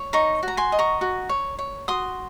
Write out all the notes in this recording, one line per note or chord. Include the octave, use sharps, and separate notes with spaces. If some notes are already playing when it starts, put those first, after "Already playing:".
Already playing: C#5
D#4 A#5 C#6
F#4
A#5
G#5 C6
D#5
A#5 C#6
F#4
C#5
C#5
F#4 C6 D#6